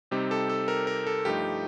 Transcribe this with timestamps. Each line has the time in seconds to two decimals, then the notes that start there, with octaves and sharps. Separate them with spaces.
0.11 C3 G3 C4 D#4 G4
0.31 A4
0.49 A4
0.68 A#4
0.87 A#4
1.06 A4
1.25 G2 F3 A3 D#4 G4